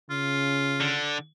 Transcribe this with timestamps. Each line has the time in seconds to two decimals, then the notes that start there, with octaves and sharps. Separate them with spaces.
0.10 C#3 F4
0.81 D3